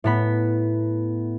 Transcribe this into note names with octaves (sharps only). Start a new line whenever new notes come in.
A2 B3 B5